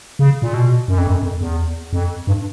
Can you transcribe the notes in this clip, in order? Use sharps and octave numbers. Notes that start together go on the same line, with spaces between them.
C#3
A#2
B2
F#2
F2
F#2
F2
E2
F2
G2